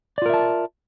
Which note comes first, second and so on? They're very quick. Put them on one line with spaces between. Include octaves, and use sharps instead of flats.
D5 F4 A#4 E5 A5